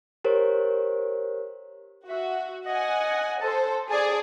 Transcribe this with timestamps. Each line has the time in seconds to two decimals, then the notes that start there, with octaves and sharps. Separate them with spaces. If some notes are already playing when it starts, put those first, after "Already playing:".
0.24 G4 A#4 C5 C#5
2.09 F#4 E5
2.66 D#5 F#5 G#5
3.41 A4 C5 A5
3.91 G#4 D5 A5